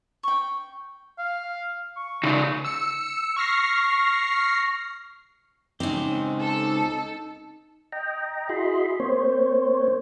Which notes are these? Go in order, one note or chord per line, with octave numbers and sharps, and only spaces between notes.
G5 C#6
F5
C#6
C#3 D#4
E6 C#7
C#6 F6 A#6 C7
C#2 C4 C#4 D#4 G4
A4
D#5 G5 A#5
E4 F#4 G#4 D#5 B5 C6
A#3 C4 C5 C#5